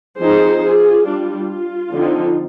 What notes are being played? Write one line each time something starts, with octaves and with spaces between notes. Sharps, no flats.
F3 C4 D#4 G#4 C5
F4 G#4
G3 D4 F4
F4
D3 F3 C4 D#4